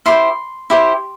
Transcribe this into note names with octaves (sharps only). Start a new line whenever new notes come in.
E4 G4 C5 C6
E4 G4 C5